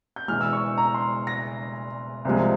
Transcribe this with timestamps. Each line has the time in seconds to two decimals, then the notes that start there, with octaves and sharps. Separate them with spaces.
0.16 G6
0.28 E1 E2 E3 G#3 F6
0.41 E6
0.53 C#6
0.78 A#5
0.94 C6
1.27 A#6
2.25 C2 C3 F3 G#3